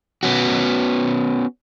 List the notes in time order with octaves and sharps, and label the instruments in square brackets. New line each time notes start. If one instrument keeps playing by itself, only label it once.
[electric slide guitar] B3 C#4 F#4